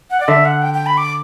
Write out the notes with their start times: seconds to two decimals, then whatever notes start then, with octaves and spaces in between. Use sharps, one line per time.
0.11 F#5
0.20 D5
0.28 D3 E5
0.45 F#5
0.62 G5
0.74 G5
0.86 B5
0.97 D6